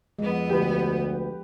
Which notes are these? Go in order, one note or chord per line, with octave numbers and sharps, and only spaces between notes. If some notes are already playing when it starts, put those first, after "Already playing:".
F2 G#3 B3
D2 G4 B4